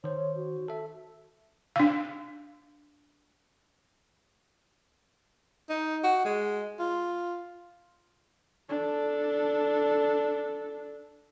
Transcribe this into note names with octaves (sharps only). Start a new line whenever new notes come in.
D#3 C5 C#5
C#5
F#4
A4 E5
D4 F5
D#4
F#4
G#3
F4
D4 A4